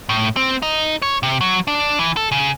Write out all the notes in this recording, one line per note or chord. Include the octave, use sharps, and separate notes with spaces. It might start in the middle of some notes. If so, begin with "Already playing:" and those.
A2
C4
D#4
C#5
C3
F#3
D4
E3
A4
C#3